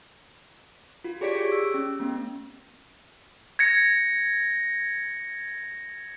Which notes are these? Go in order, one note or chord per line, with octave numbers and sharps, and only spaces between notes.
F4 F#4
G4 G#4 C#5 D5 B6 D7
G4 C#5
E6
C#4
A3 B3 C#4
G#6 A#6 C#7